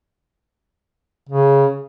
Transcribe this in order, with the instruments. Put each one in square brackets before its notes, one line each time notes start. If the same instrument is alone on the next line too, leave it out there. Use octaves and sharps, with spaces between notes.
[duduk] C#3